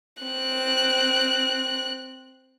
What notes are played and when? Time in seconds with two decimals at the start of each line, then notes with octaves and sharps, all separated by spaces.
0.23 C4 F#6